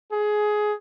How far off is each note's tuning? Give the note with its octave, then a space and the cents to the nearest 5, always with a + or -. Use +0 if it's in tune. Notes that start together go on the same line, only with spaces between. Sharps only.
G#4 +15